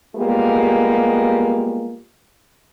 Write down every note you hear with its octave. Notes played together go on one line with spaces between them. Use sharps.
G3 G#3 A#3 B3 F4 G4